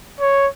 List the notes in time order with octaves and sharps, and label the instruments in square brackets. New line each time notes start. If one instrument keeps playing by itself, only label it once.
[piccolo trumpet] C#5